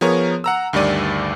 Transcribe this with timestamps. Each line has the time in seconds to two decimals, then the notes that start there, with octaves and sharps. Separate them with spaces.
0.01 F3 B3 G#4 A#4 C#5
0.44 F#5 A#5 E6
0.73 D2 G2 D#3 G3 D5 D#7